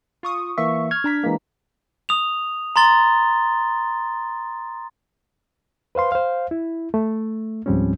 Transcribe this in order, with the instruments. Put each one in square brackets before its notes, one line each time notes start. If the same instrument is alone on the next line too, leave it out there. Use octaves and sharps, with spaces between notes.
[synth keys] F4 C#6 D#6
[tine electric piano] E3 A#3 E5 [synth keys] C#6
[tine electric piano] F6 G#6
[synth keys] D4 A#5 B6
[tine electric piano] E3 G#3 A#3
[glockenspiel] D#6 F7
A#5 C6 A6 G7
[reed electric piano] B4 C5 F5 C6
C5 F5
E4
A3
C#2 G#2 F3 G3 C4 C#4